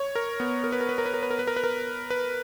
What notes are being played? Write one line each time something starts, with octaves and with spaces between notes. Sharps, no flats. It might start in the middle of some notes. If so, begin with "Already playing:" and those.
Already playing: C#5
A#4
B3
A#4
B4
A#4
B4
A#4
B4
A#4
B4
A#4
B4
A#4
B4
A#4
B4